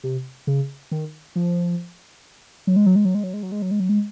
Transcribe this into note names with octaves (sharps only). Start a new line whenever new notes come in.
C3
C#3
D#3
F3
F#3
G#3
F#3
G#3
F#3
G#3
F#3
G#3
F#3
G#3
F#3
G#3
F#3
G#3